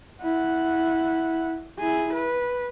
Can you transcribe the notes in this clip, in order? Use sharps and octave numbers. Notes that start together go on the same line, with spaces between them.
E4 F#5
E4 G#4
B4